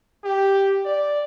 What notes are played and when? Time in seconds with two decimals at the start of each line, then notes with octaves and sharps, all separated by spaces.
0.24 G4
0.85 D5